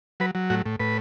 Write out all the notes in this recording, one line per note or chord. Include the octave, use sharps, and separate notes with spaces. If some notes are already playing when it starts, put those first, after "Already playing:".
F#3 B4
F#3
A2 F#4
A2
A2 B4